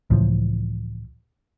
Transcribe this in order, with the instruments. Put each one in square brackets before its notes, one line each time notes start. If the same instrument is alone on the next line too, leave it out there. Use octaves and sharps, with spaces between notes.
[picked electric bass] C#2 A2 E3 F3